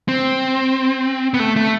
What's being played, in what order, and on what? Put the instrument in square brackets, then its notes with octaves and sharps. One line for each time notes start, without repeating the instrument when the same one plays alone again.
[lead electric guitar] C4
B3
A3
A3